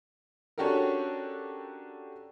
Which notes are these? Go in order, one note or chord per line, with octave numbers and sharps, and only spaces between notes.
C#4 D4 F#4 G4 A4 A#4